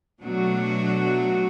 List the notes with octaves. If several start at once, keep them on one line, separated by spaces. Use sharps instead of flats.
B2 F#3 A3 D4 F#4